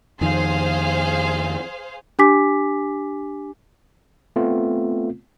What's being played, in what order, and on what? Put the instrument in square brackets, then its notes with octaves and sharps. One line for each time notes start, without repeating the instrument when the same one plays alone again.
[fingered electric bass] F2 D#3 [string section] G#4 C5 F5
[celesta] D4 G4 G#5 D6 B6
[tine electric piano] A3 B3 C4 F4